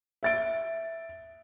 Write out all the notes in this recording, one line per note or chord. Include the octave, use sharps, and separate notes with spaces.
E5 A6 D7